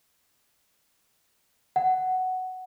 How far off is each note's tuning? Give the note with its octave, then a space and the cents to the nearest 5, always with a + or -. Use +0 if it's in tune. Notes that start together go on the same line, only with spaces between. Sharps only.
F#5 +5